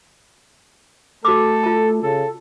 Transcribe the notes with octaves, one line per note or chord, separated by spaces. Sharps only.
A3 F#4 A4 D6
F4 A5
C#3 A4